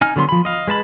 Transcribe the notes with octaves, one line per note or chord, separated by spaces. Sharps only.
D#4 G#5 F6
D3 F#3 B3 B5 C6
F3 B5
D#5 F5
G#3 B4 A5 B5